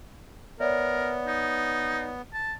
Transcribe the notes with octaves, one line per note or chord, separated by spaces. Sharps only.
B3 A#4 C#5 D5 E5
D#4
A5